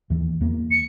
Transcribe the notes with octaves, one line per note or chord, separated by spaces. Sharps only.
D#2 E3
E2 A#3
C#7